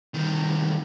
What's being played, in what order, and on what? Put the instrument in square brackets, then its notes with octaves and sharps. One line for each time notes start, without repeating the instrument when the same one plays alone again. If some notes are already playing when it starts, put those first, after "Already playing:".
[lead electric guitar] C2 D#3